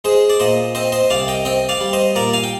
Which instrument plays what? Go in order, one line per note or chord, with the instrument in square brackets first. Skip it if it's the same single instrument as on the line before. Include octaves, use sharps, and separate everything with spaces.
[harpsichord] G#3 G#4 C5
D5
A#2 C5 D#5
C4 C5 D#5
C5 D#5
C2 D5 F5
D#5 G5
C4 D#5 G5
D5 F5
G3
C5 D#5
A#2 A#4 D5
F5 G#5
G5